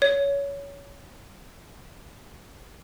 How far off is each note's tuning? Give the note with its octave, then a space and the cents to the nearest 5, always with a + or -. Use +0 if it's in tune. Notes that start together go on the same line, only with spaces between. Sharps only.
C#5 +20